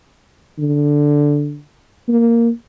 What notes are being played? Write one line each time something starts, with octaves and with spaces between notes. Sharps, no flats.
D3
A#3